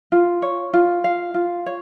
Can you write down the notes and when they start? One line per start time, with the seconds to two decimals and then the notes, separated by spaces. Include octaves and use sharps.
0.12 F4
0.42 C#5
0.73 F4
1.04 F5
1.34 F4
1.66 C#5